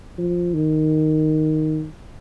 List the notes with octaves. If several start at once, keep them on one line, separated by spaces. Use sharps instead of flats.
F3
D#3